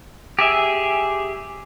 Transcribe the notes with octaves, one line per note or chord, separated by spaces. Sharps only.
G4 G#4 E5